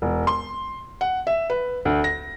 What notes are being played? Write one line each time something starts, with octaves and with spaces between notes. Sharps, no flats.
E1
C6
F#5
E5
B4
D2
A#6